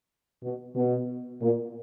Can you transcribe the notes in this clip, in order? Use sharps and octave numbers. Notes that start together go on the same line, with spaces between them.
B2
B2
A#2